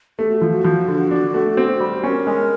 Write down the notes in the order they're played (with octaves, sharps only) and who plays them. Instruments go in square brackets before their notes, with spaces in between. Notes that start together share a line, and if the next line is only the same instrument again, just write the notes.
[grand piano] A3 [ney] G4
[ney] F#4
[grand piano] F3 [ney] F4
[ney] F#4
[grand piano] F3
D3
D4
A3
C4
G3
[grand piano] C#4 [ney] A#4
[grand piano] G#3